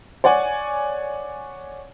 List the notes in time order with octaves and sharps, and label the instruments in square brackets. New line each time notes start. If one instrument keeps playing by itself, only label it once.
[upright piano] C#5 D5 F#5 G#5